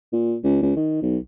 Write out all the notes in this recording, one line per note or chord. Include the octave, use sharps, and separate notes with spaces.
A#2
C#2
C#2
D#3
B1